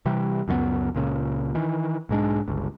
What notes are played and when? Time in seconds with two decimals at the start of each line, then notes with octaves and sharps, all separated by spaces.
0.06 C3 E3 G3
0.48 C#2 F#2 A3 B3
0.95 C#2 A#2 C#3
1.55 D#3 E3
2.09 B1 G#2 G#3 D4
2.48 G1 C#2